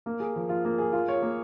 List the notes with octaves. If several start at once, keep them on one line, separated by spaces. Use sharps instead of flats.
A#3
G#4
F3
F4
A#3
G#4
F4
C#5
A#3